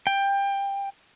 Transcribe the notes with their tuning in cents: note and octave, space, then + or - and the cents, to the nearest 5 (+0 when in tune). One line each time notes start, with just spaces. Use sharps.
G5 +20